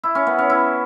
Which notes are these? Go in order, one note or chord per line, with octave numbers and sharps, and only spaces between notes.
E4
C#4
B3
C#4
E4